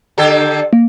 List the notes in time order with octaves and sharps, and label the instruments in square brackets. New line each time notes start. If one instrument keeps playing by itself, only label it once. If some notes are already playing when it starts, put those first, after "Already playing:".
[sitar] D3 G4 A4
[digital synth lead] A#3